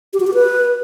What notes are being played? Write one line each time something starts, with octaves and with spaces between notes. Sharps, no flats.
G4
F#4
G4
B4